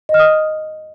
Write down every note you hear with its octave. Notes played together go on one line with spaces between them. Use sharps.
D#5
F6
D#6